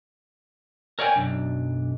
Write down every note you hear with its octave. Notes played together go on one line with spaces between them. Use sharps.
A#4 C#5 D5 E5 G5 G#5
B1 F#2 D4